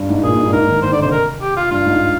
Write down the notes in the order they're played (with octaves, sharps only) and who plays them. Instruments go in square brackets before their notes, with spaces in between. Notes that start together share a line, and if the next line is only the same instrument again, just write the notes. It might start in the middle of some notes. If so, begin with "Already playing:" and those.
Already playing: [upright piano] G2
G#2
[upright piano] A#2 [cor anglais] G#4
[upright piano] G#2
G2
[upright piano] G#2 [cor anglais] A#4
[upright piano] D#3
[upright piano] D#3 [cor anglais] C5
[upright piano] D3 [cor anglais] D5
[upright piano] C3 [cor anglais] C5
[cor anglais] A#4
G4
F4
[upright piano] G2 [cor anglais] F4
[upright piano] G#2